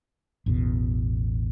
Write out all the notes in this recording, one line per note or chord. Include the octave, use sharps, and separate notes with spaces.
A1 E2 B2